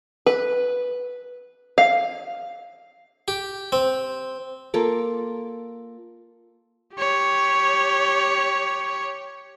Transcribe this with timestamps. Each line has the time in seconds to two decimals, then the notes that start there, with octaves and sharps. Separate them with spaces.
0.26 B4
1.78 F5
3.28 G4
3.72 C4
4.74 A#3 F4 A4 D6
6.96 G4 C#5